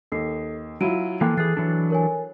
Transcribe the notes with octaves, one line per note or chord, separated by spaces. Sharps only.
D#2 A4 C7
F#3 E4 F4 D7 D#7
E3 F3 A#3 A4 G5 F#6
E3 G#4 F#6 A6 C7
E3 F#3 D4
A#4 C#5 G#5